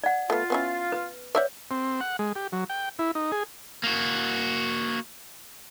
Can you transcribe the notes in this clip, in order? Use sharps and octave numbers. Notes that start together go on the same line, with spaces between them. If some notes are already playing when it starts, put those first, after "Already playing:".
D5 F#5
A3 B3 F4
B3 C#4 E4
B4
B4 C#5 D5 E5 F#5
C4
F#5
G#3
G4
F#3
G5
E4
D#4
G#4
A#3 F#4